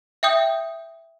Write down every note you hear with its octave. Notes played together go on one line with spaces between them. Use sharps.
E5 G5 D#6 G6